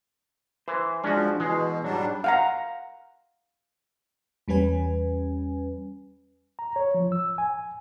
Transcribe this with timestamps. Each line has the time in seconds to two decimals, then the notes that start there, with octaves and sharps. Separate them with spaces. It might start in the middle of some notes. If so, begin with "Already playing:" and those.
0.68 E3 C5
1.04 F3 G#3 C#4 D4 F#4
1.40 B2 E3 G#3
1.84 G#2 F#3 G3 D4
2.24 F5 F#5 A#5
4.48 E2 G3 C#4 B4 G#5
6.59 A#5
6.76 C#5
6.95 F3
7.12 E6
7.38 G#5